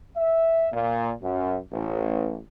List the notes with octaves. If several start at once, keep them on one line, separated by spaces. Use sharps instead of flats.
E5
A#2
F#2
A1